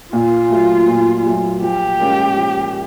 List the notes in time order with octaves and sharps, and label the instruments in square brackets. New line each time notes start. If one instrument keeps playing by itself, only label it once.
[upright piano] A#2 [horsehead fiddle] F4
[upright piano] F#3 A3
A#2
F#3 A3
[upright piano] F3 [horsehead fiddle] G4
[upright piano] G#3 C#4 F4 A#4
F3